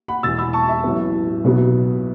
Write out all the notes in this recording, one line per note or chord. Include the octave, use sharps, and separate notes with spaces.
F#5 B5
E1 E2 E3 E6 A6
B5 E6
A5 C#6
E5
A1 A2 F#3 B3
B1 B2 B3